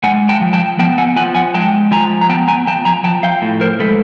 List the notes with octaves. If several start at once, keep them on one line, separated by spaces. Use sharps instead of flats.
G#3 F#5 G#5
G5 A5
F3
G5 A5
B3 G5 A5
F#5 G#5
F3 F#5 G#5
F#5 G#5
G#3 G5 A5
F3 G#5 A#5
A#5
B3 G5 A5
G#5 A#5
F3 G5 A5
G#5 A#5
F3 G5 A5
F5 G5
A2
A#4 C5
G#3 A4 B4